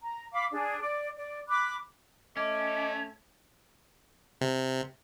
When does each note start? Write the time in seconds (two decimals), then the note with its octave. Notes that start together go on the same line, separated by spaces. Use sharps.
0.01 A#5
0.32 F5 B5 D6
0.52 D4 G#4
0.81 D5
1.17 D5
1.48 B5 D6 F#6
2.37 A3 C#4 D#5 D6
4.41 C3